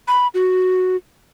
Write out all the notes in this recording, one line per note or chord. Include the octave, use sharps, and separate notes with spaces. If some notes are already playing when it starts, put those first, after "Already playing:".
B5
F#4